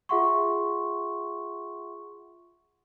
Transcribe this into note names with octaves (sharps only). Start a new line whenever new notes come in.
F4 G#4 E5 F#5 C6 C#6